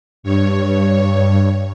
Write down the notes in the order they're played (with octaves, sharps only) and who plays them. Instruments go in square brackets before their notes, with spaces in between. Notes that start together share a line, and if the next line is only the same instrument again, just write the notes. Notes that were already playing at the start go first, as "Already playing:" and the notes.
[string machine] G2 C#5